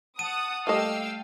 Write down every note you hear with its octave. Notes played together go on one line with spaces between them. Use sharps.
F#5 A5 D#6 D#7
G3 A3 A#3 A4 D#5 F5 G5 E6